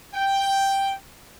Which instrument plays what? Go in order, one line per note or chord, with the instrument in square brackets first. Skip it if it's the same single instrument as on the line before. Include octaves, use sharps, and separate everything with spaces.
[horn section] G5